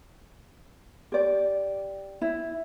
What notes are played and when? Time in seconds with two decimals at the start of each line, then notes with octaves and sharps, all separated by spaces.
1.12 G4 D5
2.22 E4